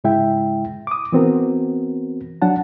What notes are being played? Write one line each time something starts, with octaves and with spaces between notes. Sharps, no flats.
G#2 C#3 G#3 E4 E5 G5
D6 D#6
E3 B3 C4 F#4 A#4
F#3 D4 F#5 A5